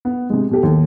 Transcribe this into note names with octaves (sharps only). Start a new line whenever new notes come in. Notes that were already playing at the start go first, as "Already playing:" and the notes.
B3
C3 G#3
B2 G4 A4
D#2